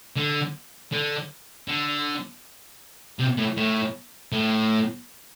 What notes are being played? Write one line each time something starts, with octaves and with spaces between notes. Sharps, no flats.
D3
D3
D3
C3
A2
A2
A2